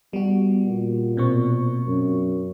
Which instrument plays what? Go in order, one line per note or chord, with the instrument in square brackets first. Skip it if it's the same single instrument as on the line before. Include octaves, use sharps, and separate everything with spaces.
[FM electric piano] G3 F#4 [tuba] B3
[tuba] A#2
[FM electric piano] B2 C4 C#6
[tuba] F#2